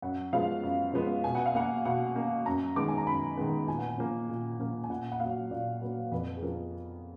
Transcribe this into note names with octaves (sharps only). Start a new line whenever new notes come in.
F#2 F#5
F3 G#3 B3 F5
F#2
F3 G#3 B3
B2 G#5
F#5
F5
A#3 F#5
B2 F#5
A#3
F#2 A#5
D#3 G#3 B3 D6
G#5
A#5
F#2 B5
D#3 G#3 B3
A#2 G#5
F#5
G#5
F3 A#3
A#2
F3 A#3
G#5
A#2 F#5
F#5
F#3 A#3 F5
A#2 D5
F#3 A#3 B4
F2 B4
G#4
F3 B3 A#4